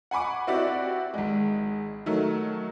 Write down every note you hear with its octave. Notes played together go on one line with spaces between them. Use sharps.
F#5 G#5 B5 C#6 D6
C4 E4 F#4 G4 D5
G#1 G#3
D#3 F#3 A3